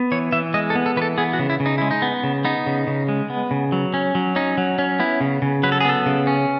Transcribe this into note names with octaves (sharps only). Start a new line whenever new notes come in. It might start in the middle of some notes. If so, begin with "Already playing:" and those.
Already playing: B3
E3 C#5
E3 E5
G#3 D#5
A4
B3
A4
E3 B4
A4
B3 G#4
F#4
C#3
E4
C#3
D#4
G#3 E4
D#4
B3
C#3
B3 D#4
C#3
C#3
G#3
B3
C#3
F#3
C#4
F#3
C#4 D#4
F#3
C#4
B3 E4
C#3
C#3
F#3 B4
A4
G#4
B3 A4
C#3
C#4